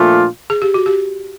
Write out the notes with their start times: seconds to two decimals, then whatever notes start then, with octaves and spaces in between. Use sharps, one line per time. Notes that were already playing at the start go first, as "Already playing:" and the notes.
Already playing: A#2 F3 A3 D4 F4
0.50 G#4
0.62 G4
0.74 F#4
0.86 G4